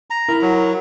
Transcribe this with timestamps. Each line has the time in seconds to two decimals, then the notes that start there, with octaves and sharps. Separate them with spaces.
0.10 A#5
0.28 E4 A#4
0.42 F#3